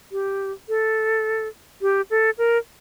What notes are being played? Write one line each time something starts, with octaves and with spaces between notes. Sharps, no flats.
G4
A4
G4
A4
A#4